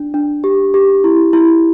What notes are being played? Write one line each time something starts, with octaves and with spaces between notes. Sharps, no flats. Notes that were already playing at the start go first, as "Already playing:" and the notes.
Already playing: D4
D4
G4
G4
E4
E4